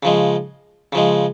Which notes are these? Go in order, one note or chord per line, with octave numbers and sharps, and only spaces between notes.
C#3 F3 G#3
C#3 F3 G#3